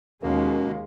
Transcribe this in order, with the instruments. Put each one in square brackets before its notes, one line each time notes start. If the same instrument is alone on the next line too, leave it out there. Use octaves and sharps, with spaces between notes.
[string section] D#2 G#3 [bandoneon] B2 A#3 [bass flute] C#4 [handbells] A#4 F5